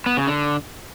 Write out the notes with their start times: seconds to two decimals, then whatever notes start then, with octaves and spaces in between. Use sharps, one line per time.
0.06 B3
0.17 C#3
0.27 D3